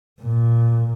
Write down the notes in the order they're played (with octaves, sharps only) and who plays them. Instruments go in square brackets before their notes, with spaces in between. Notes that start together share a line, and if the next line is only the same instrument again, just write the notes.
[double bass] A#2